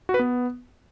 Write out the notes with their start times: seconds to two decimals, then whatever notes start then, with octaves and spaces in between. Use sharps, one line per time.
0.09 F#4
0.14 B4
0.19 B3